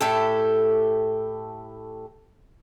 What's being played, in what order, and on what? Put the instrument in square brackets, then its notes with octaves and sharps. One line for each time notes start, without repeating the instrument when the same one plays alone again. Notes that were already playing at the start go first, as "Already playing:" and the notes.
[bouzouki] A2 G4 A4